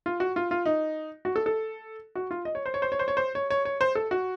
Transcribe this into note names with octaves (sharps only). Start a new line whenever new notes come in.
F4
F#4
F4
F4
D#4
F#4
A4
A4
F#4
F4
D#5
C#5
C5
C#5
C5
C#5
C5
C#5
C5
C#5
C#5
C#5
C5
A4
F#4